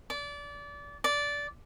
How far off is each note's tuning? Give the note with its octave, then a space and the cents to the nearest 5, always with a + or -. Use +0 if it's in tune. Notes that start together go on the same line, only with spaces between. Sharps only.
D5 -25
D5 -15